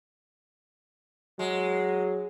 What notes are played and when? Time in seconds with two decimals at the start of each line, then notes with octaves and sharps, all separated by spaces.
1.39 F#3 G#3